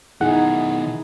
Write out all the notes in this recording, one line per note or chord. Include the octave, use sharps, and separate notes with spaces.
B2 D#3 D#4 E4 G#4 F#5